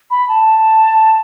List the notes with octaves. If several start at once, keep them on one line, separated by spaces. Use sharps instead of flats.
B5
A5